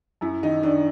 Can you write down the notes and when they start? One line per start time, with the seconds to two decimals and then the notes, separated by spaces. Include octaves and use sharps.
0.21 F#2 E4
0.43 D#3 D#4
0.63 D#3 D4